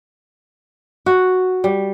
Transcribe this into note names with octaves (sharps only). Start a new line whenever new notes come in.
F#4
G3